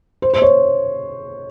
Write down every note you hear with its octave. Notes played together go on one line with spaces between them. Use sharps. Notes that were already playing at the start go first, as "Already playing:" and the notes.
C5
C5
C#5